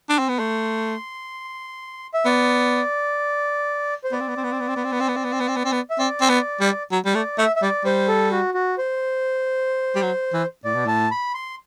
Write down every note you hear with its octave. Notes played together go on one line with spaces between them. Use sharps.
D4
C4
B3
A3 C6
E5
B3 D5
C5
B3 D5
C4
B3
C4
B3
C4
B3
C4
B3
C4
B3
C4
B3
C4
B3
C4
B3
C4
B3
C4
B3
E5
C4 D5
C4
B3
G3
F#3
G3
A3 D5
A3 E5
E5
G3 D5
G3 C5
A4
F#4
F#4
C5
G3
F#3
E3
A2 D5
B2
A2 A5
B5
C6